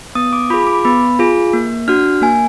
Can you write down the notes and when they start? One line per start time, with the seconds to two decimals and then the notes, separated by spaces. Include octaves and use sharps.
0.15 B3 D#6
0.33 D6
0.50 F4 B5
0.54 G#4
0.67 D6
0.85 B3 B5
1.19 F4 G#4
1.53 A#3
1.88 D4 F#4 F6
2.22 A#3 G#5